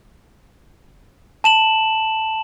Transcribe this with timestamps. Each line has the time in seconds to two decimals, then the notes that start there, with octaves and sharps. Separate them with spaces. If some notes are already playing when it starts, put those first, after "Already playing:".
1.44 A5 E7 F#7